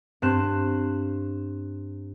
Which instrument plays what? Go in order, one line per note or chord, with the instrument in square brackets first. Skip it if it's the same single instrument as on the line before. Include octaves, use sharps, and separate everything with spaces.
[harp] G2 C4 F#6 C7 E7